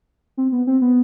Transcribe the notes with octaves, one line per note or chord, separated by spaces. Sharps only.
C4
B3
C4
B3